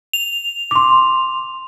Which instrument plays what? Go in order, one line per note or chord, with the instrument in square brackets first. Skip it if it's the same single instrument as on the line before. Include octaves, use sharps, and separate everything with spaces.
[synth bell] F7
[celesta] C6 D6